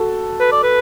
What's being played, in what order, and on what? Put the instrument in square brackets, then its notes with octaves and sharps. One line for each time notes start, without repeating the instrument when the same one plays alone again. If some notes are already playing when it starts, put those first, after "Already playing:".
Already playing: [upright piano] F#4 A4
[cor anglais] B4
D5
B4